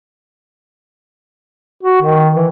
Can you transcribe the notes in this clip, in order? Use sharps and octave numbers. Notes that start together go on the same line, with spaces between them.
F#4
D#3
E3